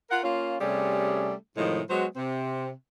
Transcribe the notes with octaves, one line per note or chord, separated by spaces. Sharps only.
F4 A#4 F#5
A#3 C#4 F4
C3 G3 A3 C#4 G#4
A2 C3 D#3 F3 G#3
F#3 G#3 B3 F#4 C5
C3 C4